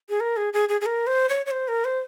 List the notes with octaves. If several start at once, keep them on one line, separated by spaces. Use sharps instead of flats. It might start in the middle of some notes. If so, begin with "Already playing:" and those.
G#4
A#4
G#4
G#4
G#4
G#4
A#4
C5
C#5
C#5
C5
A#4
C5